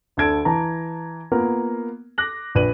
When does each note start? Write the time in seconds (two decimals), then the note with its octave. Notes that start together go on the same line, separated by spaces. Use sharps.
0.17 D2 D3 A4 G#6 D7
0.45 E3 A5 A#5
1.32 A#3 B3 F4 A#4
2.18 D6 F#6 A#6 F#7
2.55 A#1 B4 D#7 F#7